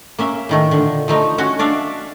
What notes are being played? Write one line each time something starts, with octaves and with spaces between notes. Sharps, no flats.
A#3 C#4 E5
A2 D#3 A3
A#2 D3
F3 A3 D#4
C#4 F#4 C#5
D4 D5 E5 F5